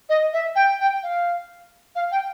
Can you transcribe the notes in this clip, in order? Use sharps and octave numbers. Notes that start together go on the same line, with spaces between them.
D#5
E5
G5
G5
F5
F5
G5